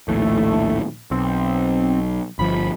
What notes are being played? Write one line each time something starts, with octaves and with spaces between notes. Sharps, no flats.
A#1 D#2 A2 A3
B1 C4
G1 F3 B5